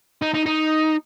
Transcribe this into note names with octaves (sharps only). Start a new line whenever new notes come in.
D#4
D#4
D#4